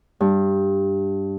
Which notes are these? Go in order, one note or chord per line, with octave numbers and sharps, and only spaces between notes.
G2